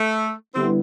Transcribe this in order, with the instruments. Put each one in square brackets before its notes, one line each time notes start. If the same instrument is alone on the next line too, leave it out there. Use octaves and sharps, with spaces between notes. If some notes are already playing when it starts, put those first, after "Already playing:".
Already playing: [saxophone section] A3
[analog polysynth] D3 G3 B3 E4 [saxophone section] C4